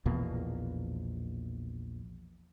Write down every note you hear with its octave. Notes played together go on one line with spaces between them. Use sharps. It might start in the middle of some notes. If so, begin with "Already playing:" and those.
A#1 E2 B2 A#3